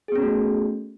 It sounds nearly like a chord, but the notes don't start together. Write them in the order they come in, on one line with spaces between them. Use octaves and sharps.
G#4 B3 C#4 F#4 A3